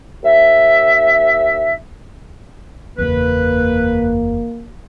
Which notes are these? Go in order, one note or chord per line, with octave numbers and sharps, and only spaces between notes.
D#2 E5
F#1 E2 A#3 B4